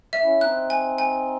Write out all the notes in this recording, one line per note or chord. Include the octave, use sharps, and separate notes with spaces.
E5
C#4 E4
C4 D#4 F#6
G#5
G#5